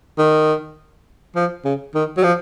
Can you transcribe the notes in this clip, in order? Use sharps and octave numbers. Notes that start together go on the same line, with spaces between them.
D#3
F3
C#3
D#3
F#3
F3